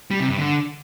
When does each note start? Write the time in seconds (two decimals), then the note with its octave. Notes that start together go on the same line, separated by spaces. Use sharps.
0.11 G3
0.20 C3
0.29 G2
0.38 D3